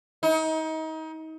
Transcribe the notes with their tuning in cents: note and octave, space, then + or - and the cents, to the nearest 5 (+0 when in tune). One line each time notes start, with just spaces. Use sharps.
D#4 +30